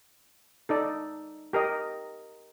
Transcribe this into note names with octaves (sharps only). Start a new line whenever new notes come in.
D#4 A4 D5
G4 A#4 D#5